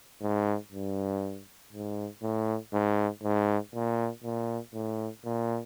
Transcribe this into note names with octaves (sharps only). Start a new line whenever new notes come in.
G#2
G2
G#2
A2
G#2
G#2
A#2
A#2
A2
A#2